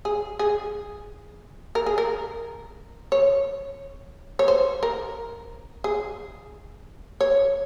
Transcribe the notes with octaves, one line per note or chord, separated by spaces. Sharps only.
G#4
G#4
A#4
G#4
A#4
C#5
C#5
C5
A#4
G#4
C#5